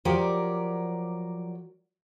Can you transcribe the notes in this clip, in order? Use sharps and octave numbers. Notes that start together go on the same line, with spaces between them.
F3 F#3 G4 A#4 D5